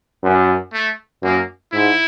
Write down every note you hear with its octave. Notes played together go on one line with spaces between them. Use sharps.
F#2
A3
F#2 A#3
G#2 E4